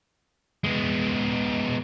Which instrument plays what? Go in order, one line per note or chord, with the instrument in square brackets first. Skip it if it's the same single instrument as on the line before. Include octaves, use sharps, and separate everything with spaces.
[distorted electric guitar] G#3 B3